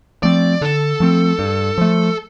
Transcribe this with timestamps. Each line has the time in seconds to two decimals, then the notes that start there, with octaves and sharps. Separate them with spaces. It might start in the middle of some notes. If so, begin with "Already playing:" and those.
0.23 F3 A3 C4 D5
0.61 D3 A4
1.00 F3 A3 C4
1.39 G2
1.78 F3 A3